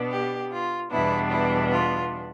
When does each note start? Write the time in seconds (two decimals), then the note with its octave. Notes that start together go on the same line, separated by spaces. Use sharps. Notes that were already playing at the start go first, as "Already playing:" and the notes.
Already playing: B2 B3 D4
0.12 G4
0.52 F4
0.91 E2 B2 G3 B3 D4 E4
1.31 E4
1.71 F4